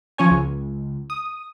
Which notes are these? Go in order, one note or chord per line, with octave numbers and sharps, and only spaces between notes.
F3 C#4 C#5 G#5
C#2
D#6